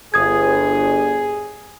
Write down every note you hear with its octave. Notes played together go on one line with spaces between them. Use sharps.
G1 G#4 D#6 G#6